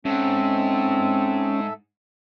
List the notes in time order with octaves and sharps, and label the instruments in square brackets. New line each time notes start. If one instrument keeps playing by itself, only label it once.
[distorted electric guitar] G#2 [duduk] C4 [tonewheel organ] C#4 [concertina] A4 E5